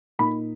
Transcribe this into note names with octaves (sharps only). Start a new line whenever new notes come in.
A#2 A#3 D#4 B5